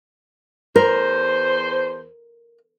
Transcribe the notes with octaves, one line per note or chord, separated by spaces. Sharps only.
E2 A#4 C5